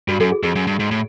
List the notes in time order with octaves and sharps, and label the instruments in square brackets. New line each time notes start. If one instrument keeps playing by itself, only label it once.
[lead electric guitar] G2 [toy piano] F#4
[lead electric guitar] F#2 [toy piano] A4
[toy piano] G#4
[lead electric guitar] F2 [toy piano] G#4
[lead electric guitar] F#2
G2
G#2
A2